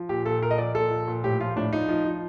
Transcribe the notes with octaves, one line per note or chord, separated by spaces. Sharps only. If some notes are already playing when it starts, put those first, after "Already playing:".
Already playing: F3
A#2 G4
A#2 A4
A#2 A#4
D#5
F3 D5
A#2 A4
F3
A#2
A2 G4
F3 F4
A2 D4
F3 D#4
F3
F3